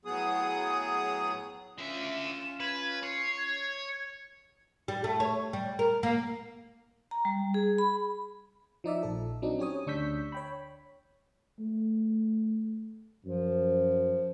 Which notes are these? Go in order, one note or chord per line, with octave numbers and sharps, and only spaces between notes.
A2 F#3 B3 G#4 D#6
D3 C#4 F4 E5
E7
B4 G#6
C#5 C7
G#6
G#6
G3
A3
C#5
G3
A#4
A#3
A#5
G3
G#4
B5
F3 D#4 D5 E5
A#1 A4
F#3 C4 D4 D#4
C#4 G4 C#5 D#6
D2 D4 C#6 E6 G6 B6
C#5 G5 B5
A3
F#2 F3